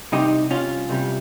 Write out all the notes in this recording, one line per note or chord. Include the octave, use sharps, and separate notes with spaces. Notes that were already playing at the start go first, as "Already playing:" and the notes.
C2 C3 G3 D#4 G4
C#4 F4
C2 C3 G3